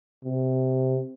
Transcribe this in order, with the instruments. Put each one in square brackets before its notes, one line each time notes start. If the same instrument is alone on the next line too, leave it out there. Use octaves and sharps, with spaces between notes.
[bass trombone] C3